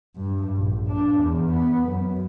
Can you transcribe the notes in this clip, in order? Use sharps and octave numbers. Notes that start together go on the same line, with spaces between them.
G2
A#1
D4
E2
B3
F#2